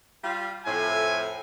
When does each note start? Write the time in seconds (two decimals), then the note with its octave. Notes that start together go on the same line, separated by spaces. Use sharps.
0.23 G3 F4
0.66 F2 A2 G#5